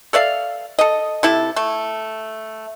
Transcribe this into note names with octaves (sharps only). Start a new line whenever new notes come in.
A4 D5 E5 F5
A4 D#5
C3 E4 A4
A3